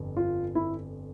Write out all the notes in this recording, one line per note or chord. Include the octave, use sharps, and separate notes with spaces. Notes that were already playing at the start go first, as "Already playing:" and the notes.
Already playing: G1 F2
F4
E4